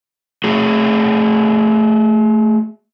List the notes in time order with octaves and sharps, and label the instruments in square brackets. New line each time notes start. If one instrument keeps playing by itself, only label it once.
[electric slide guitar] A3 F#4 G#4